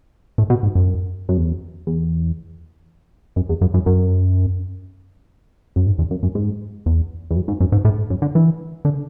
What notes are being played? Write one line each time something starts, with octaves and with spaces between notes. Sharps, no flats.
A2
B2
G#2
F#2
F#2
E2
E2
F#2
E2
F#2
F#2
F#2
F#2
G#2
E2
F#2
F#2
G#2
E2
E2
F#2
G#2
F#2
G#2
A2
F#2
D3
E3
D3